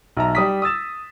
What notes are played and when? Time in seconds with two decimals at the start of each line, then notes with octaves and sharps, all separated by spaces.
0.17 B1 E5 A#5
0.35 G3 D#6 B6
0.62 D#6 E6 A6 E7